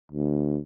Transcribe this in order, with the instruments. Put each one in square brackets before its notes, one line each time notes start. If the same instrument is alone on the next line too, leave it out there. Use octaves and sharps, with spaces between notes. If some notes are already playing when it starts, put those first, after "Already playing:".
[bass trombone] D2